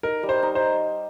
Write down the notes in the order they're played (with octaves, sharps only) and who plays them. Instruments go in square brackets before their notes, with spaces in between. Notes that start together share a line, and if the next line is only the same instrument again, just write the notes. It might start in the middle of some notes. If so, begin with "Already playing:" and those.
[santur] D#4 [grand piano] A#4
[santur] G3
[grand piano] C5
[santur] D#4
[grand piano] C5